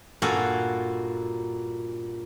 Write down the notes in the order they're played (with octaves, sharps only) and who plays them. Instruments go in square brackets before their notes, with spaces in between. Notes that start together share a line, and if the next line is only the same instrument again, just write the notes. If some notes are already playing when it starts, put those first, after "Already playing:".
[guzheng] G2 A#2 F#4 A4 F5 G#5